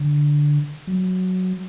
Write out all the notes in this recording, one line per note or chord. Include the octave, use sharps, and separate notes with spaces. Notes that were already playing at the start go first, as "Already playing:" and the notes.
Already playing: D3
F#3